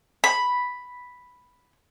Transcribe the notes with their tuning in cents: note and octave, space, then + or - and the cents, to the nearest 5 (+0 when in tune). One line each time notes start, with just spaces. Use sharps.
B5 +0